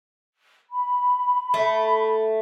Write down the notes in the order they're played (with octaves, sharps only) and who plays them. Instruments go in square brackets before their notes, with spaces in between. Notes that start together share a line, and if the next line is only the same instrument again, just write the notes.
[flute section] B5
[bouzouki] A3